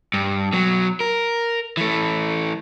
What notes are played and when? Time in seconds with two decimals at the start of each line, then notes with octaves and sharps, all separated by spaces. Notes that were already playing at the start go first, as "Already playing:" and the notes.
0.14 G2
0.53 B2 F#3
1.00 A#4
1.77 E3 A3